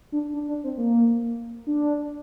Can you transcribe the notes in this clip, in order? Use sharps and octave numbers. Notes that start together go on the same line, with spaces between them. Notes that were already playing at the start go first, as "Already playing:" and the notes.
D4
D4
D4
C4
A#3
D4